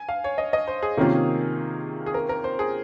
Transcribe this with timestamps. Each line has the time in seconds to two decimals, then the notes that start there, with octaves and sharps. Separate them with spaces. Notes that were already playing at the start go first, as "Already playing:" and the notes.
Already playing: G#5
0.09 F5
0.24 C#5
0.38 D#5
0.53 D#5
0.68 C5
0.83 G#4
0.97 C3 D#3 A#3 C#4 F4
2.06 G#4
2.14 A#4
2.29 A#4
2.44 C5
2.59 G#4